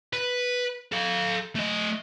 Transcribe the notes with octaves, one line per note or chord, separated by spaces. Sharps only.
B4
A4 F5
A3 D#5